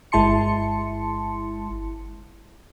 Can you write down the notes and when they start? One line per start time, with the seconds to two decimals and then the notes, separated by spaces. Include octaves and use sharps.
0.12 G1 G#3 E4 A5 C6 C#7